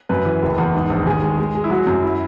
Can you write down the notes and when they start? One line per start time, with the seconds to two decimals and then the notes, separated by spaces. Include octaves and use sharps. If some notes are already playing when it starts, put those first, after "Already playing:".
0.09 F#2 B4
0.25 E3
0.42 F#1
0.58 E2
0.75 G#2
0.90 A#1
1.06 D#2 G#4
1.22 G#3
1.38 G#3
1.55 G#3
1.64 E4
1.70 F#3 F#4
1.87 F#2
2.03 E4